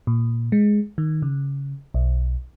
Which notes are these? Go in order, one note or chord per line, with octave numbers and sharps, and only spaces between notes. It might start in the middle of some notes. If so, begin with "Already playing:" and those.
A#2
G#3
D#3
C#3
B1